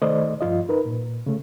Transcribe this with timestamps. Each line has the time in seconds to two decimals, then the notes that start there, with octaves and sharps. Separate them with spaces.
0.02 D#3 A3 C5 D5 D#5
0.41 G2 F3 F4 D#5
0.69 D#4 A#4 B4
0.85 A#2
1.26 C#3 A3